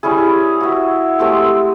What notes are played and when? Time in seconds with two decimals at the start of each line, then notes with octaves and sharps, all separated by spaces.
0.03 G3 C#4 E4 G#4
0.60 F#4 E5
1.19 G#3 A3 C4 G4